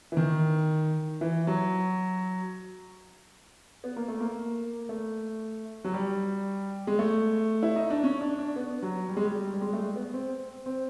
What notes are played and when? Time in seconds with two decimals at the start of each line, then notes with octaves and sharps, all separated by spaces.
0.12 E3
0.17 D#3
1.21 E3
1.47 F#3
3.84 B3
3.96 A#3
4.08 A3
4.20 A#3
4.89 A3
5.84 F#3
5.94 G3
6.87 G#3
6.99 A3
7.63 E4
7.76 D#4
7.90 D4
8.04 C#4
8.21 D4
8.39 D4
8.56 B3
8.83 F#3
9.09 G3
9.17 G#3
9.25 G3
9.54 G3
9.61 G#3
9.73 A3
9.79 G#3
9.96 B3
10.13 C4
10.66 C4